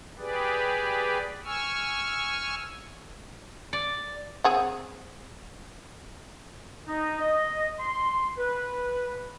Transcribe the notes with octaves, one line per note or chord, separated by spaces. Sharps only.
G4 G#4 B4 D5
G#5 C#6 E6 F6
D5
C4 G#4 F#5
D#4
D#5
C6
B4